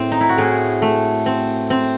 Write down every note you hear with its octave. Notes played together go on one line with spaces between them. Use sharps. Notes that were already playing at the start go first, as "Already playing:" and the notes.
Already playing: A2 C4
D#4
E4
F#4
A2 G#4
A3
C4
C4